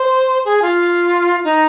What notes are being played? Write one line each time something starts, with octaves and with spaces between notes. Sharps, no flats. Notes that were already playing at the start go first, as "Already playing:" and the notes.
Already playing: C5
G#4
F4
D#4